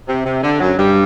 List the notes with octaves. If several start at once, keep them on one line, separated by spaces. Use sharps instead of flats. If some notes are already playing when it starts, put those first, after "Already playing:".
C3
C3
D3
F#2 F#3
G2 G3